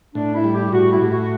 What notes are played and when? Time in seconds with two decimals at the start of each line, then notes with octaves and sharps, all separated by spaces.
0.15 A2 D4
0.34 E4
0.44 G3
0.54 G4
0.73 A2 F#4
0.92 E4
1.01 A2
1.11 F#4